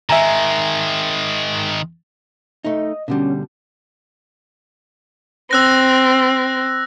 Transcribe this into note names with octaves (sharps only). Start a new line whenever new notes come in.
D#3 G#3 E5 G#5 A#5
A3 D#4 D#5
B2 D3 G3 C#4
C4 E6 F#6 A#6